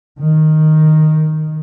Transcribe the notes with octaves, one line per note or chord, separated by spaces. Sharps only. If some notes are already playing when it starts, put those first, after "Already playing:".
D#3